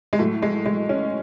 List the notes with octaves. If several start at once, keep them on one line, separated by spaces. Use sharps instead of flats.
G#3
A2 F#3 A3
G#3
G#3
C#4